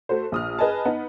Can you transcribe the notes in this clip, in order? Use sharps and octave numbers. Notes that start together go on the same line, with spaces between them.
A3 F#4 C5
A#1 D#6 F6
G#4 B4 D#5 G#5 A5
B3 D#4